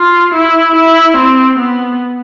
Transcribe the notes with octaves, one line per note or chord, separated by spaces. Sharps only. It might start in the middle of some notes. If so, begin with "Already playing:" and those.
Already playing: F4
E4
E4
C4
B3